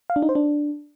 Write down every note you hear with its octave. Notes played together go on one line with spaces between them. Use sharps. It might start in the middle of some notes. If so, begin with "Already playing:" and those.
F5
D4
D#4
C5
D4